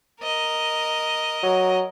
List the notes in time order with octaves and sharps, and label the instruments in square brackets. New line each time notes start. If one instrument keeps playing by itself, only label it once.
[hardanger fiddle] A#4 D#5
[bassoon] F#3